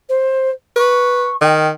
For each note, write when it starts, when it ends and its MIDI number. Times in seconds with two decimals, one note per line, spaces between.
0.08 0.50 72
0.76 1.31 71
0.76 1.35 85
1.41 1.70 51
1.41 1.70 79